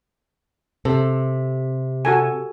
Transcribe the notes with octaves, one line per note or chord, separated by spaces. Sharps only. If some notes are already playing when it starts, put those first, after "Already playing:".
C3 A4
F#4 A4 G#5